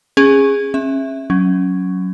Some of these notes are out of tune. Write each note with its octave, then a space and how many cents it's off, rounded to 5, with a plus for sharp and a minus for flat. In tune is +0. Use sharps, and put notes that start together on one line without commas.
C#4 -15 G#4 -15 G#5 +5
C#4 -40 E5 +0
F#3 +0 C#4 +0